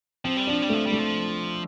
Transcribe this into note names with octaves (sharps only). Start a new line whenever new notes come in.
F3 C4
G3
F3 D4
G3
F3 A3
G3
A3
F3